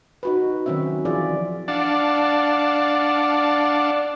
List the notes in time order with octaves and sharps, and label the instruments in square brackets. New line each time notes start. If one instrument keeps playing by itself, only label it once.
[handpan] D#4 F#4 B4
D#3 F#3 C4 C#4 E5
E3 F3 F4 G#4 D5
[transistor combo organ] D4 D5 F5 F#5 A5